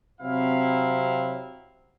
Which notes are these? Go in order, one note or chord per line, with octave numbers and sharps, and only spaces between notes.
C3 F#3 C4 E4 F5